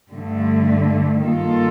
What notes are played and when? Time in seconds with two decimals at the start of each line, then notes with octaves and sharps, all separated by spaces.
0.10 G2 D3 A3
1.22 G2 D#3 A#3 F4 A4